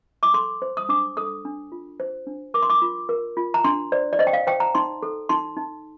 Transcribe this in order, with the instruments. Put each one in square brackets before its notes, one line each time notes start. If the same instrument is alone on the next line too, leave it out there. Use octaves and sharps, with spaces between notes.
[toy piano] D6
A4 C6
C5
D#6
D4 D6
A4 D#6
D4
F4
C5
D4
A#4 D6
C6
D6
F4
A#4
F4
A#5
D4 C6
C5 D5
D5
C5 D#5
G5
F5
C5 G5
A#5
D#4 C6
A4
D#4 C6
D#4